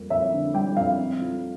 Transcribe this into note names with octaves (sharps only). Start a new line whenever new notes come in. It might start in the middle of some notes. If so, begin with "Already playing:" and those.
Already playing: F2 G3 A#3
F2 E5
D3
G3 G5
F2 F5
C4
F3